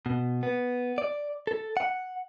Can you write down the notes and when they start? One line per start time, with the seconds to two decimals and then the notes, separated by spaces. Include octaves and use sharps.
0.06 B2
0.43 B3
0.98 D5
1.47 A4
1.77 F#5